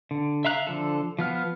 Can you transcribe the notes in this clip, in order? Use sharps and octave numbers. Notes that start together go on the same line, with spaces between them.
D3
E5 F5 A#5 F#6
D3 F3 A4
F3 B3 F6